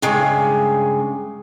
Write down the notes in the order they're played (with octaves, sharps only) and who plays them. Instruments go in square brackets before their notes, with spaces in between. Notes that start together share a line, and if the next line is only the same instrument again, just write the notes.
[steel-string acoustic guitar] G2 C#3 G#3